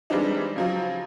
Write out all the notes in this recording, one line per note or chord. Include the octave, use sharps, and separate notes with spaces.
E3 G3 G#3 C4 D4 D#4
C#3 F3 F#3